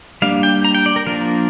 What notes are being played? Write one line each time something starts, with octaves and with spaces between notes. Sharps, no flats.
G3 A#3 D4 F5
G5
A#5
G5
D5
A#4
F3 A#3 D4 A#4